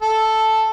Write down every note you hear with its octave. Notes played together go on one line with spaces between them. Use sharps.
A4